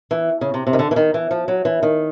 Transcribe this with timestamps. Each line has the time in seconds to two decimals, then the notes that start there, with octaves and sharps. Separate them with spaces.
0.11 E3
0.41 C#3
0.54 C3
0.67 C3
0.73 D#3
0.79 D3
0.91 E3
0.96 D#3
1.14 E3
1.31 F3
1.48 F#3
1.65 E3
1.83 D#3